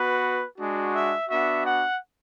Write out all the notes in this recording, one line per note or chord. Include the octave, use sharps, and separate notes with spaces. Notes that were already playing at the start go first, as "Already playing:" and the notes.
Already playing: B3 F#4 B4
G#3 D4 F#4
E5
B3 D4 F#4 E5
F#5